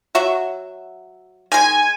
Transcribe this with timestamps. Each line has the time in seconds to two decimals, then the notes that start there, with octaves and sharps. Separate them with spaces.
0.15 F#3 F#4 E5
1.52 D#3 G#3 G#5